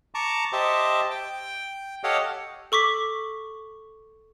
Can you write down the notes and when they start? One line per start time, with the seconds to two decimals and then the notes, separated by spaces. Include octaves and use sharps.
0.15 A5 A#5 C#6 D6
0.53 G4 C5 D#5 E5 A5
1.11 G5
2.04 G4 A4 C#5 D#5 F5 F#5
2.72 A4 C#6 D6 B6